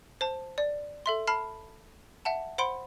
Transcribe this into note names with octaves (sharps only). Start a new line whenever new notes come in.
C5 A5
D5
A4 E5 C6
A5 B5 F6 C7
E5 F#5 A5
C5 F#5 B5 C6 D7 G7